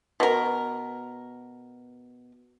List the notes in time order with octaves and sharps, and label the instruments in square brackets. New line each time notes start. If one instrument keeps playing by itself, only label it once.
[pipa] B2 A#4